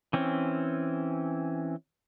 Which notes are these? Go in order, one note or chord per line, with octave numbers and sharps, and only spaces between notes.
E3 C4 C#4